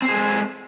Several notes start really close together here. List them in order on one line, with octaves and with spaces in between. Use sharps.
C4 C5 G#4 G#3 A4